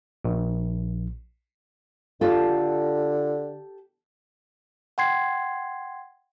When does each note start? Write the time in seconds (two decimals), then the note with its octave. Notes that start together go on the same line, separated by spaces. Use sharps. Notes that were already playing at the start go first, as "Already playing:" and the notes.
0.25 A#1
2.21 D3 F4 G4 A4 A5
4.98 F#5 G5 C6 G#6 C7